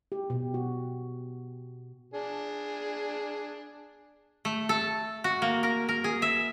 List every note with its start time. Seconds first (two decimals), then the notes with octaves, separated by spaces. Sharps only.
0.12 G4
0.30 B2
0.54 F#4
2.14 D4 G#4
4.45 A3
4.69 A4
5.24 F#4
5.42 A#3
5.63 A#4
5.89 A#4
6.04 G#4
6.22 E5